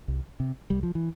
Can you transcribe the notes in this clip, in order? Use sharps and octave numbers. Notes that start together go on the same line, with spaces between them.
C2
C3
C2 G3
F3
E3